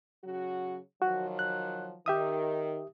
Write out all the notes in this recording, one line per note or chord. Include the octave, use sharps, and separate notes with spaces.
C#3 F#3 F#4
D#3 F3 F#3 F#4
F#6
D#3 G4 E5 D#6